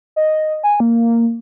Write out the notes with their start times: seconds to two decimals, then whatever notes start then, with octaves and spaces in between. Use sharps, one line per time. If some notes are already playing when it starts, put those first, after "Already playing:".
0.16 D#5
0.63 G#5
0.80 A#3